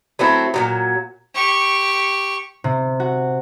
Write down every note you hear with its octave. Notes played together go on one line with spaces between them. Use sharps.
F#3 A3 C4 E4
A#2 D#3 F#3
G4 C#6
C3
F#4